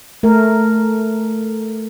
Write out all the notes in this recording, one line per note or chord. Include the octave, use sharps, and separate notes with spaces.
A3 A#4